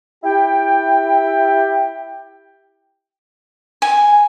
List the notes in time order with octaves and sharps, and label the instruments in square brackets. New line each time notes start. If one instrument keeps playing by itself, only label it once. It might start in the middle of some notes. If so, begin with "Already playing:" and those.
[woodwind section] E4 G4 G5
[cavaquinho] G#5